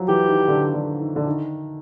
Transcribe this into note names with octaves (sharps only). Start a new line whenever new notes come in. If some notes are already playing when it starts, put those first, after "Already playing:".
Already playing: F3 F#3
E3 G4
D#3
D3
D3
D#3
D3
D#3